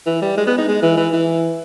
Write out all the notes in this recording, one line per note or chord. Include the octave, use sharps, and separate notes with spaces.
E3
G3
G#3
B3
D#4
G#3
E3
E3
E3